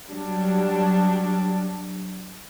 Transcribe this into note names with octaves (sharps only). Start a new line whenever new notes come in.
F#3 G3 D4